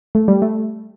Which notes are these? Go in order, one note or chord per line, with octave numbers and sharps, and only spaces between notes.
A3
G3
A3